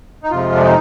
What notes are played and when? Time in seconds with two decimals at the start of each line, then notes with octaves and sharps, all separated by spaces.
0.23 D#4
0.31 F2 C3 F3 G#3 F4
0.56 D4
0.62 D#4